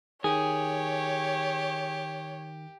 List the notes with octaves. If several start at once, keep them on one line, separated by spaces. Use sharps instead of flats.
D#3 G4 G#4 C#5